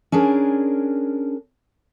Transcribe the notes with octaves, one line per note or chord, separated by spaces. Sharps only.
C#4 D4 G#4 A#4